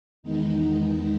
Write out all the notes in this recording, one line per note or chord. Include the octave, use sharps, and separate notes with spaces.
E2 D#3 G#3 B3 D#4